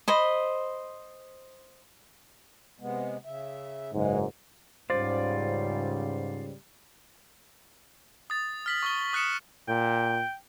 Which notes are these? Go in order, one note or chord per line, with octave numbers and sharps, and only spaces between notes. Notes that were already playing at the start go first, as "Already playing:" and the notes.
C5 D#5 B5
C3 G#3 B3
C#3 E5
F#1 G#2 E3 G#3
C#2 G#2 C#3 G3 F4 C5 D5
D#6 A6
F6 B6 F#7
C#6 D#6 G7
D#6 F#6 B6 C#7 E7
A#2 G5